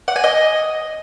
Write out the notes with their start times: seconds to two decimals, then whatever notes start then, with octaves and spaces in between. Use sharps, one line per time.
0.08 F#5
0.16 G#5
0.24 D#5